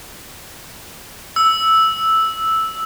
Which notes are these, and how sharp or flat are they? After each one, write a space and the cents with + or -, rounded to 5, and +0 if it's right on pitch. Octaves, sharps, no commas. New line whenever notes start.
E6 -5